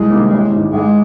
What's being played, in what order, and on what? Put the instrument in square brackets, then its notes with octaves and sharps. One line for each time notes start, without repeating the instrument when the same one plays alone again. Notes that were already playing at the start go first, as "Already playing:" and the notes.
Already playing: [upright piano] C2 [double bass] G#3
[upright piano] C3 D#3 G3 A#3
A1
G#2 D#3
[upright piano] G#1 [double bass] G#3